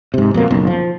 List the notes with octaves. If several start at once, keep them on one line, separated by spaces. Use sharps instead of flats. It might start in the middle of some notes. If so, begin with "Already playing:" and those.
G#2 C3
F2 B2 A#3
F#1 B1
F3